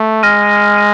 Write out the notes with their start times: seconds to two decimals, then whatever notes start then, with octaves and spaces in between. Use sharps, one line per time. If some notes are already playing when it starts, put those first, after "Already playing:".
Already playing: A3
0.23 G#3 F6 A#6 D#7
0.77 D#7